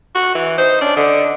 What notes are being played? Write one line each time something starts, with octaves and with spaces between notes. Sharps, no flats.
F#4
E3
D#4 C5
C#4 D4
D3 D#5